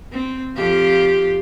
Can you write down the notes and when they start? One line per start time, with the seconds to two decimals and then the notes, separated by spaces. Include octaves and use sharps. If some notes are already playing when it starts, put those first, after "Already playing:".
0.12 C4
0.56 F2 F4 G4